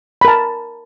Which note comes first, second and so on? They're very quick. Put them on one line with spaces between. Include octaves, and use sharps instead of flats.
B5 A#4 A5